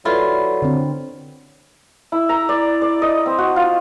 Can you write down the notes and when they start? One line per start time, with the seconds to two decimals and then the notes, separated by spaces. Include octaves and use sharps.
0.05 F#3 E4 F4 A4 B4 D5
0.62 D3 C4
2.12 E4
2.29 A#5
2.49 D5
2.82 D5
3.02 D#5
3.26 C4
3.38 F#4
3.56 F4